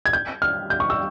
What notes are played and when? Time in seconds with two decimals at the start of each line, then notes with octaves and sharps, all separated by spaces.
0.06 G#6
0.13 G6
0.42 F6
0.70 G6
0.80 C#6
0.90 E6